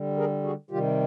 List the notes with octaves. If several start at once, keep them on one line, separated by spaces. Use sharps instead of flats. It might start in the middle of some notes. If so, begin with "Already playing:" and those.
Already playing: D3 G3
G#4 A#4
F#4 G#4
C3 D#3 G3 F4 G4